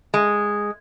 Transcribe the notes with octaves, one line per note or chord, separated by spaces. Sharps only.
G#3